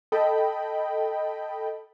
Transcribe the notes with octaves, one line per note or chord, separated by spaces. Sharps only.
A4 D#5 G5 B5